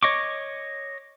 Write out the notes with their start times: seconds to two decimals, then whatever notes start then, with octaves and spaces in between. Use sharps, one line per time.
0.03 C#5 D#5 C#6 D6